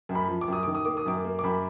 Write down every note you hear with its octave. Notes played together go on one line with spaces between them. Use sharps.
F#2
B5
F3
D6
F#2 D#6
D#3 D6
D#6
A#3 D6
D#6
F#2 D6
A#3
D6
F#2 B5